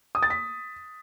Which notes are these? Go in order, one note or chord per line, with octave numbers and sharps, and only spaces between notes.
D#6
A6
B6